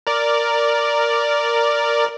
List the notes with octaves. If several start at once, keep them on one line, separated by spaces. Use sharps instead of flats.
A#4 D5